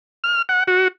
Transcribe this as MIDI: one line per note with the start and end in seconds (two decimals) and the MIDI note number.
0.24 0.42 89
0.49 0.64 78
0.68 0.88 66